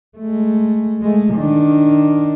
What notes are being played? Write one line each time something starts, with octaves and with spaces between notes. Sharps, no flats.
G#3 A3
G#3 A3
D#3 D4